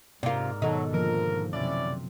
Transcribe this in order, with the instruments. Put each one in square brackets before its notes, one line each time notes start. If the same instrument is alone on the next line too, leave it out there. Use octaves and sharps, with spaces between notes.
[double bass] G#2 [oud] C3 F4 [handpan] A#4 D5
[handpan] B2 D#3 A4 [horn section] F#3 [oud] D#4
[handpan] D3 F3 A#3 [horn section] A#4
[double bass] F#2 C3 [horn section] C#4 E4 D5